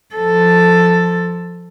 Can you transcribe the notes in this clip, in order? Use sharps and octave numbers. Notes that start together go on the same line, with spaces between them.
F3 A4